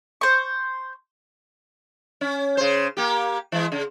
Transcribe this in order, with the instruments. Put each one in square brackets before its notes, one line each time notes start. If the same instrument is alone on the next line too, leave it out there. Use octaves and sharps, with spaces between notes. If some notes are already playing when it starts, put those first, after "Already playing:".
[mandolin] C5 C#6
[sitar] C#4
C#3 C5
A#3 G4
E3 G#3
C#3